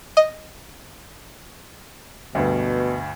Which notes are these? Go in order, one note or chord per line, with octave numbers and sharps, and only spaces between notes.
D#5
D2 G2 B2